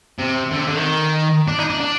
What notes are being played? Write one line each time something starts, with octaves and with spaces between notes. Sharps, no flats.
C3
D3
C3
D3
D#3
D4
D#4
D4
D4